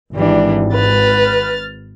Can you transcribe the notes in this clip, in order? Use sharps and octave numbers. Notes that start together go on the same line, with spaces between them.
G#1 E3 G3 D4
B4 F6 A6